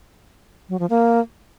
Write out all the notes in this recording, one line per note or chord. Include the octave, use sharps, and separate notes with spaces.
F#3
F3
A#3